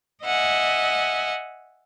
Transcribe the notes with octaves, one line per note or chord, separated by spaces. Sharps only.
D#5 E5 F#5 G#5